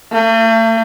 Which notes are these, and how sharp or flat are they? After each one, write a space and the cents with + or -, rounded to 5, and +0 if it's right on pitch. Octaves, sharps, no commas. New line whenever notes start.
A3 +45